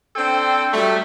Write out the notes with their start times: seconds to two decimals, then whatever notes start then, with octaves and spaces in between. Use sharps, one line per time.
0.16 C4 D4 A4 C5 G5
0.73 F#3 G3 A3